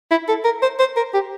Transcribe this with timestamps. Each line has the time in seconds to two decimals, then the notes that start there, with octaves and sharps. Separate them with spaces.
0.11 E4
0.28 A4
0.44 A#4
0.62 C5
0.79 C5
0.96 A#4
1.14 G4